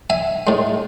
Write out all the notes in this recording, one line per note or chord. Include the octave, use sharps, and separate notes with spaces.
E5 G#5
A2 G#3